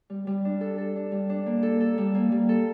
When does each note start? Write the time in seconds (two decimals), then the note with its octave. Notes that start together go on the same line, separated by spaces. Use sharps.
0.10 G3
0.27 G3
0.45 D4
0.61 A4
0.78 A4
0.96 D4
1.12 G3
1.30 D4
1.46 A#3
1.63 A4
1.80 A4
1.98 G3
2.15 A#3
2.32 G3
2.49 A4